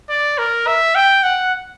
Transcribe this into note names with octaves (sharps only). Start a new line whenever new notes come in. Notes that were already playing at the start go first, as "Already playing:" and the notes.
D5
A#4
E5
G5
F#5